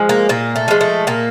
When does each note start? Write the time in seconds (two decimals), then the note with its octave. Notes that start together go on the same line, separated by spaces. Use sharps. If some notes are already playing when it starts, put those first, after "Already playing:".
Already playing: F3 G#3
0.09 A#3
0.29 A#2 A#3
0.56 A3
0.68 F3 G#3
0.81 A3
1.07 A#2 A#3